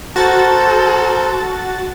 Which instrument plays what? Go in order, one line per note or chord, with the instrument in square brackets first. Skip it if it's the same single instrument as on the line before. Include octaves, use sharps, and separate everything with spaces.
[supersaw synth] F#4 A6 [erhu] A4 [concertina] A#4 C5 A5